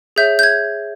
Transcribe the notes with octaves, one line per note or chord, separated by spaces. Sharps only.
G#4 C#5 E5 G6
G6
G#6